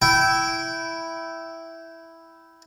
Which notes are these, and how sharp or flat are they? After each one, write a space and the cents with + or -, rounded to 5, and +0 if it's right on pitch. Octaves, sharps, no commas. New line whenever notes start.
E4 +0 G5 -20